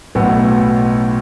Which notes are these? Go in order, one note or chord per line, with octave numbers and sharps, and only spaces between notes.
B1 A2 F#3 B3